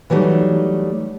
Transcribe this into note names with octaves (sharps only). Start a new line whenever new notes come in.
E3 F#3 G3 A3 D#4